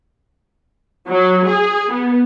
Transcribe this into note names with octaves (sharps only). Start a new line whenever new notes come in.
F#3
G#4
B3